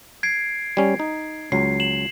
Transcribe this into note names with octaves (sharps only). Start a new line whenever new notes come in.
G#6 C7 D7
G3 C#4
D#4
C#2 F#3 C7
E7 F#7